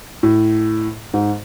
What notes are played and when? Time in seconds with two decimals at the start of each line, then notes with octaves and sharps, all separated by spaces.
0.23 A2
1.14 G#2